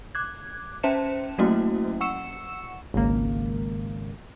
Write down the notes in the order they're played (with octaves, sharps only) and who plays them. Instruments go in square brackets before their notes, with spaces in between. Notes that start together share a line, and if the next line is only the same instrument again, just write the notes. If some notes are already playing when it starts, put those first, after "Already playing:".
[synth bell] D6 F#6 G#6
C#4 C5 E5 A5 C#7 E7
F#3 A3 A#3 C#4 E4 F#4
F#5 C#6 E6 C#7 E7
[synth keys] G#1 C#2 A#3